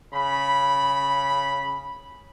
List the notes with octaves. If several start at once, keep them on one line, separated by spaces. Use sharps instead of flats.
C#3 B5